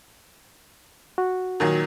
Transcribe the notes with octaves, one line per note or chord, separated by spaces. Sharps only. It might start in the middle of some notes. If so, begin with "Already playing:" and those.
F#4
A#2 D#3 F#3